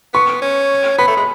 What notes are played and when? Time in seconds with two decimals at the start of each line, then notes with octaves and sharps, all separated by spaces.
0.14 B3 C#6
0.42 C#4
0.98 B3 B5
1.08 A3
1.17 G#3